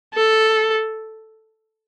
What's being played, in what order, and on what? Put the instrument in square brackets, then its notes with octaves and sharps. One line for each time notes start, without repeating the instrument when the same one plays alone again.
[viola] A4